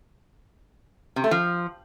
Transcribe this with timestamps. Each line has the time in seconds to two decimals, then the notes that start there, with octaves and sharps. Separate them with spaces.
1.16 C3
1.24 A3
1.31 F3